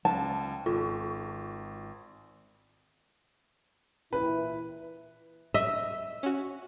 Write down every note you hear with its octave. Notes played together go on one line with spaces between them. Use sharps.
C#2 A5
G#1 F4
A#2 E3 E4 B4
D#5 E5
C#4 F#4